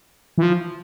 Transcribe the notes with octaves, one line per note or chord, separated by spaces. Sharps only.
E3
F3